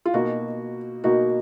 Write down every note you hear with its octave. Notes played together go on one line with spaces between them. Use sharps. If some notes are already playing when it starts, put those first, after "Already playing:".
F4
B2 A#3 D#4 F#4
B2 A#3 D#4 F#4